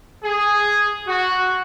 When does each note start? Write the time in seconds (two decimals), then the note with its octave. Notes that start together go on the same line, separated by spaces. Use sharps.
0.24 G#4
1.07 F#4